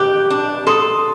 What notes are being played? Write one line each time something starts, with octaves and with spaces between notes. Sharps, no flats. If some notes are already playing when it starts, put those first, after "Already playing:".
Already playing: G4 D6 F#6 G6
D4
A4 C6 D#6